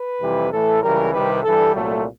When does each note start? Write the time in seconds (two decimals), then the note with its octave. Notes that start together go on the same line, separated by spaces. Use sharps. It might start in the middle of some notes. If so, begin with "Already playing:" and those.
Already playing: B4
0.21 F2 C3 E3 G3
0.52 A2 E3 A3 A4
0.83 C#2 C#3 E3 G3 A#4
1.13 C2 C3 D#3 G3 B4
1.44 G2 E3 G3 A4
1.75 C2 A#2 F#3 A3